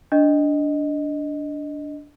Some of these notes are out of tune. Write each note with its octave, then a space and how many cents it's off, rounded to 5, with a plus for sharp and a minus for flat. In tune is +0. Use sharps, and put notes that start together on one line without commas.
D4 -10 D#5 +0